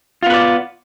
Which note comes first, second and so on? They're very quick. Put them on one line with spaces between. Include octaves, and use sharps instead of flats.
F4 B3 B4 D5